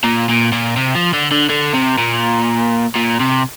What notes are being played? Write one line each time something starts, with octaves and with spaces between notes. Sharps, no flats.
A#2
A#2
A#2
C3
F3
D3
D3
D3
C3
A#2
A#2
C3